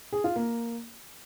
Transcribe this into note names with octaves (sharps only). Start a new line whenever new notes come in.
G#4
F4
A#3